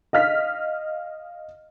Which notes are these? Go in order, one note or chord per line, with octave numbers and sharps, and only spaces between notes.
D#5 F5 F6 B6